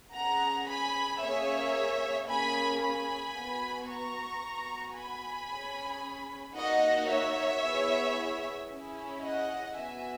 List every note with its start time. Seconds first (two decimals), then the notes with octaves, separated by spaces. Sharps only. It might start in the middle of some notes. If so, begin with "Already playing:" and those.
0.14 C#4 G#4 F#5 A#5
0.68 G#5 B5
1.21 A#3 C#4 G#4 C#5 E5
2.28 A#3 C#4 G#4 G#5 B5
2.81 G#5 B5
3.35 B3 F#4
3.88 A#5 C#6
4.42 B3 F#4
4.95 G#5 B5
5.49 C#4 G#4
6.55 A#3 D#4 F#4 D#5 F#5
7.09 C#5 E5
7.63 B3 E4 G#4
8.70 C#4 E4 G#4
9.22 D#5 F#5
9.76 B3 F#4 E5 G#5